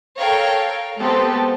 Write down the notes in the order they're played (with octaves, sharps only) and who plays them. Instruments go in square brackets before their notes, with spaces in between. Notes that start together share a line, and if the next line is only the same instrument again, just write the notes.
[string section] A4 A#4 C#5 F5 G5
G#3 B3 C4 G4 A4